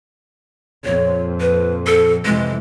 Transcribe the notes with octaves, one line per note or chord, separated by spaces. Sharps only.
F2 A#2 C#5
B4
A4
F2 C3 E3 G#3